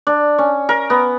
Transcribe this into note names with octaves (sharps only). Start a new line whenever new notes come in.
D4
C#4
A#4
B3